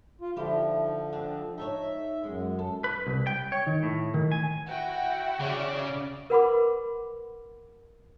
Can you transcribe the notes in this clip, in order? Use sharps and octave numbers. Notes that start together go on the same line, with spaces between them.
F4
D3 F3 D#4 E4 G4
C4 D4
D#4 A4 C#5 E5
F#2 G#3
A4
B4
C2
G5
C#5
D#3
A2
D#3
G#5
E4 F#4 F#5 G5
C#3 D5
A#4 B4 F#5 B5 C6 D6